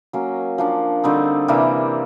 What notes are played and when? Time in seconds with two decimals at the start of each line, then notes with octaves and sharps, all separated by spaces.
0.13 F#3 A#3 C#4
0.58 F3 A#3 D4
1.04 D3 G3 C4 D#4
1.48 C3 E3 G3 A#3